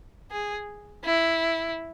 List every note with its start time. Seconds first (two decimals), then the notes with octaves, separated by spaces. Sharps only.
0.31 G#4
1.05 E4